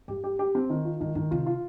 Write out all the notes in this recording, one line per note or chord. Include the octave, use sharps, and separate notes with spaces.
G2 G4
G4
G4
C4
D#3
F4
G2 D#3
G2 D#3
C3 F4
F4